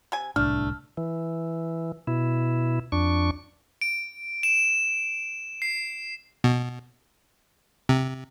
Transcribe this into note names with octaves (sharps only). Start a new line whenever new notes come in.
C3 G#5
D1 C2 A2 A3 D4 F6
E3
B2 E4
F2 D4 C#6
D7
E7
C7
B2
C3